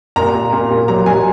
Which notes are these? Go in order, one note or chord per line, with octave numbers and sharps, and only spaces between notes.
A#2 A#5
A#2
A#2
A#2
F#3 A#5
F#3 G#5